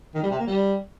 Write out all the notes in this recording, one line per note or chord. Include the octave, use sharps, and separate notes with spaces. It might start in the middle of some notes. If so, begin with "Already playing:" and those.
D#3
G3
C3
A#3
G3